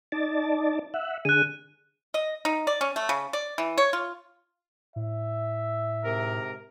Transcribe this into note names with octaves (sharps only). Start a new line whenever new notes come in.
D#4 D5 A5
E5 F#5
D3 G#4 F#6 D#7
D#5
D#4
D5
C#4
A3
C#3
D5
E3
C#5
F4
A2 E5
G#2 C3 A#4